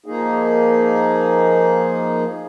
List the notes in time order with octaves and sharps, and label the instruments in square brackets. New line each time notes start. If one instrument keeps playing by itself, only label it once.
[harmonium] F3 A#3 D#4 G#4